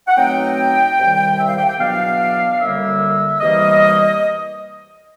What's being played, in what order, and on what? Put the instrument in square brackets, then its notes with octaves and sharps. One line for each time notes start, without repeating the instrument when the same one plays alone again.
[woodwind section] F#5
B2 F#3 A3 C4 D#4 G5
C2 C3 D#3 G3
E5
F5
G5
G5
E2 B2 F#3 B3 D4 F5
F#2 D3 G3 A#3 E5
E2 C3 E3 G3 A#3 D#5